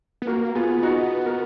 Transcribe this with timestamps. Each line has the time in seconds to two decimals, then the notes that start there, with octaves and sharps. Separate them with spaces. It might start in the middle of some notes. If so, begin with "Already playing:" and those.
0.22 B3
0.27 A#3 F#4 A#4
0.55 B3 F4 G#4
0.83 D#4 F#4
1.26 A#4